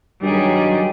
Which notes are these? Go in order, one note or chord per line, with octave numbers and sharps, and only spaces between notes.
G2 D#3 F#3 G3 G#4